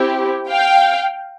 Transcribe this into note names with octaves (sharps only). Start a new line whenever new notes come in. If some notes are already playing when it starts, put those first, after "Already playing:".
Already playing: C4 E4 G4
F5 G5